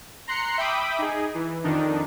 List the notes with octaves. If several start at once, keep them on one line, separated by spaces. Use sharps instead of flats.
A#5 C6 F#6 C7 C#7
E5 G5 B5 D6 D#6
D#4 G#4
E3
F2 D#3 D4 D#4